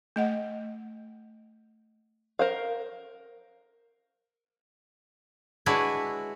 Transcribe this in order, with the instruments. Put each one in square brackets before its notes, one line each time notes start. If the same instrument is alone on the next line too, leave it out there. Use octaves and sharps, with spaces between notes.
[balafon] A3 D#5 F#5
[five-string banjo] A#4 C5 F5
[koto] G#3 D4 E4 F#4 B4 C#5